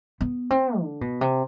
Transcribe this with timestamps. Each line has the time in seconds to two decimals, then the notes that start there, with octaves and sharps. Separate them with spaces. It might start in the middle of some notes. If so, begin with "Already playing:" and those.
0.21 B3
0.50 C4
0.81 D3
1.01 B2
1.21 C3